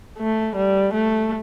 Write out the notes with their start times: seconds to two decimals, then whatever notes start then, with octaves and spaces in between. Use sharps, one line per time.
0.19 A3
0.56 G3
0.94 A3